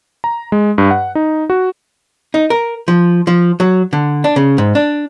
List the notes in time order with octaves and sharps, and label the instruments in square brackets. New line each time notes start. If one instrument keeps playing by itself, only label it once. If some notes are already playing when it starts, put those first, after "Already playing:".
[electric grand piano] A#5
G#3
G2
F#5
D#4
F#4
[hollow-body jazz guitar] D#4
A#4
F3
F3
F#3
D3
D4
C#3
G#2
D4